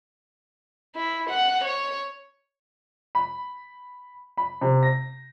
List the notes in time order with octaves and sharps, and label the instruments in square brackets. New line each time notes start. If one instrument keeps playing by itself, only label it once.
[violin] E4
F#5
C#5
[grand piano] B5
B5
C3
A#6